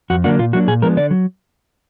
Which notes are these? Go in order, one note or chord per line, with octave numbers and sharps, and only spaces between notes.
F2 F#4
D3 F#3 A#3 D4 F#4
A#2 F4
F#3 A#3 D4 F#4
A#2 G#4
F3 G#3 B3 D4 A#4
D3 D5
F#3